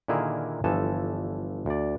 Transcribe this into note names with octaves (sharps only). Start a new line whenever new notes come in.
A#2 D3 D#3 E4 G#4 A#4
G1 E3 F3 A4 G#5 A5
D2 D5